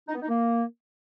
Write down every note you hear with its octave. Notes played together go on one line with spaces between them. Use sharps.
D#4
B3
D#4
A#3